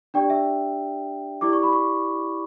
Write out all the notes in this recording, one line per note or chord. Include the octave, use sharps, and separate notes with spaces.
D4 G4 D5 G5
E5
E4 G4 D5 D6
C#6
B5
C#6